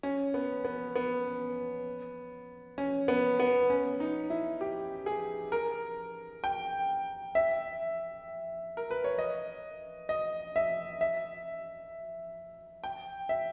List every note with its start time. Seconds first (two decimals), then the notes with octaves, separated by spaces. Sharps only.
0.03 C#4
0.34 B3
0.65 B3
0.96 B3
2.78 C#4
3.08 B3
3.40 B3
3.70 C#4
4.00 D#4
4.30 E4
4.61 G4
5.06 G#4
5.52 A#4
6.44 G5
7.35 E5
8.77 A#4
8.90 B4
9.04 C#5
9.19 D#5
10.09 D#5
10.56 E5
11.01 E5
12.84 G5
13.29 E5